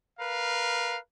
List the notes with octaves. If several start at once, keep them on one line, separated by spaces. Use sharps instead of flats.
A#4 B4 F5